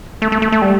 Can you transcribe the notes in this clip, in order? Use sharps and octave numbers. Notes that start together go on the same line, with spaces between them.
A3
A3
A3
A3
G3